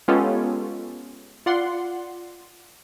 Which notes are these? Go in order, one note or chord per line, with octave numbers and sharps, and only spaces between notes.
G#3 B3 C#4 F4 G4 A4
F4 D5 F#5 C6